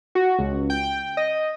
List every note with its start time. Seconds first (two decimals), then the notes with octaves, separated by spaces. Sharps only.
0.15 F#4
0.39 C#2
0.70 G5
1.17 D#5